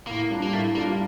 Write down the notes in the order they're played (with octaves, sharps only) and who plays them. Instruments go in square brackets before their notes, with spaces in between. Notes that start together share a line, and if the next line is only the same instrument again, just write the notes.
[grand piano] A2 [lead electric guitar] A#3
[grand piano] G3 D4 F4
[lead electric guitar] A#3
[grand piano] A2 [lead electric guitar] A3
[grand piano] G3 D4 F4 [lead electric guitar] A#3